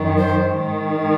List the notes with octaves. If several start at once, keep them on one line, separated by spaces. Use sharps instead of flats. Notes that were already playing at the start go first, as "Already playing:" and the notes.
Already playing: F#2 D#3
C5
G#2 D#3